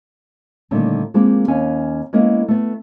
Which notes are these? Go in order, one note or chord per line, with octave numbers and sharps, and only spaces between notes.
A#2 D3 D#3 G3 A3 C#4
F3 G#3 A#3 C4 F4 G4
D#2 C#4 F5 G#5
G#3 A#3 B3 C#4 E4 A#4
A3 B3